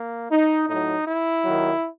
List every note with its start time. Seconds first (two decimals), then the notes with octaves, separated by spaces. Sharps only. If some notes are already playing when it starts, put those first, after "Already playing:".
Already playing: A#3
0.31 D#4
0.68 A2 F#3 D#4
1.07 E4
1.45 D#2 D#3 F#3